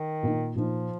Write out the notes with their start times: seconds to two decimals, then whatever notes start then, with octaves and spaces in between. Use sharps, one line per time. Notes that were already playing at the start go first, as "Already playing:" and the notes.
Already playing: D#3
0.23 A#2 A#3 D#4
0.55 A#2 F3 A#3 D#4